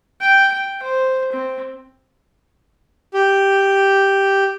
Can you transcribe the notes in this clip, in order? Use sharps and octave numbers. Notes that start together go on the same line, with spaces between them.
G5
G5
C5
C4
G4